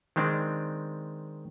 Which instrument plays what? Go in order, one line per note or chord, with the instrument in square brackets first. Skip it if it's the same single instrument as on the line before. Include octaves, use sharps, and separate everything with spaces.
[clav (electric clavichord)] D#3 G#3 C4 D4